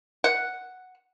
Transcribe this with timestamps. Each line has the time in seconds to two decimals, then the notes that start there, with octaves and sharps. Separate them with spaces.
0.24 F#5